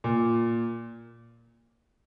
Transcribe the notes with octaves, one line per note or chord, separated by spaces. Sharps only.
A#2